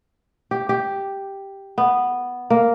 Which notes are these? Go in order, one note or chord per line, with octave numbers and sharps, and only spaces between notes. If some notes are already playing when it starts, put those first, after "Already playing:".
G4
G4
B3
A#3